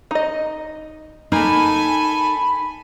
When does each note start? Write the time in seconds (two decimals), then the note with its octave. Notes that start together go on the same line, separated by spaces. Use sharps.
0.11 D#4 D#5
1.32 A#3 D#4 A4 G#5 B5